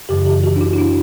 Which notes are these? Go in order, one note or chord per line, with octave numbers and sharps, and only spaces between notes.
F#2 C#3 E3 G4
G4
F#4
D4
E4
E4
D4